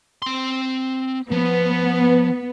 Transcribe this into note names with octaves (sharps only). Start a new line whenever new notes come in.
C4 C6
F3 B3